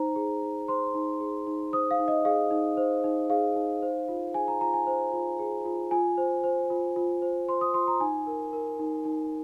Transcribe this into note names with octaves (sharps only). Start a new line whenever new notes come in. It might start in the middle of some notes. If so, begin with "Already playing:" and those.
Already playing: D#4 C5 A#5
G#4
D#4
C5 C6
D#4
G#4
D#4
C5 D#6
F5
D#4
D#5
G#4 F5
D#4
C5
D#4
G#4 F5
D#4
C5
F4
G#4 G#5
A#5
F4 A#5
G#5
C5
F4
G#4
F4
F4 G#5
C5
C5
F4
F4
C5
C5 C6
D#6
F4 C6
A#5
D#4 G#5
A#4
A#4
D#4
D#4